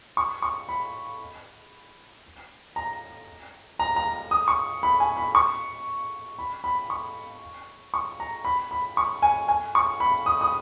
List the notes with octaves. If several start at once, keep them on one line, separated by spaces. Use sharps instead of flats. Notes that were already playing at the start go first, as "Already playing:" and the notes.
C#6
C#6
B5
A#5
A#5
A#5
D#6
C#6
B5
G#5
B5
C#6
B5
B5
C#6
C#6
A#5
B5
B5
C#6
G#5
G#5
C#6
B5
D#6
D#6